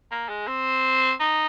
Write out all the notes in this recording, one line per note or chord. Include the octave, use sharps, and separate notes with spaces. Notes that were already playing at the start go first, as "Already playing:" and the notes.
A#3
G#3
C4
D#4